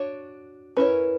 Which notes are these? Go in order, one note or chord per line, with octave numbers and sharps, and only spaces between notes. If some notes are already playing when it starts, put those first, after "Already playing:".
Already playing: D4 F#4 C#5
C#4 E4 A#4 B4 C#5